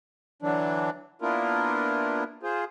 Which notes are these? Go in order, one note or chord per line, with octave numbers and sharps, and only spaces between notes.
D3 E3 F#3 D4
A#3 B3 D4 E4 F4 A#4
F4 G#4 C5